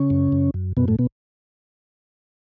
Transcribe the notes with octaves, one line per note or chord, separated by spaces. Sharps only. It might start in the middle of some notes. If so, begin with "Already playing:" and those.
Already playing: C#3 C#4
F#2
F#2
F#2
F#2 B2 B3
A2 A3
B2 B3